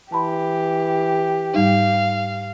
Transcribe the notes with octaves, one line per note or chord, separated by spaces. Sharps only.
E3 G4 A5 B5 C6
G#2 G3 D#4 F5